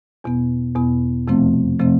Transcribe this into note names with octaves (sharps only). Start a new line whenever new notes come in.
E2 B2 B3
E2 B2 B3
F2 C3 F3 A3 C4
C3 F3 A3 C4